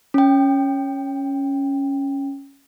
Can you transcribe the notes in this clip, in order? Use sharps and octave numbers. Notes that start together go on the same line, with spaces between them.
C#4 G5